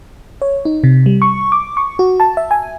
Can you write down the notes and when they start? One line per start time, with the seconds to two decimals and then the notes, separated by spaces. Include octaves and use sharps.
0.42 C#5
0.65 D#4
0.84 C3
1.06 G3
1.22 C#6
1.52 D6
1.77 C#6
1.99 F#4
2.20 A5
2.37 E5
2.51 G#5